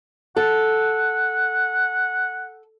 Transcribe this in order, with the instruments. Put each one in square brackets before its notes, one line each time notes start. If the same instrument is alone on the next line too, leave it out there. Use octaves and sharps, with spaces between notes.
[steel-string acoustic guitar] A4 [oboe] F#5